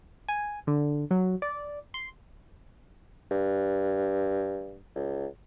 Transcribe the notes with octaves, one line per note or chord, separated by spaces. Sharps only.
G#5
D3
F#3
D5
C6
G2
C#2